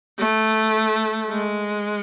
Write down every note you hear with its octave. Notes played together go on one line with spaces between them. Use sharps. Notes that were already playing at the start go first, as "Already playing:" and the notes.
A3
G#3